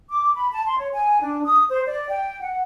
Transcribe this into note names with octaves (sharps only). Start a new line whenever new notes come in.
D6
B5
A5
C6
C#5
G#5
D4
D#6
C5
D5
G5
F#5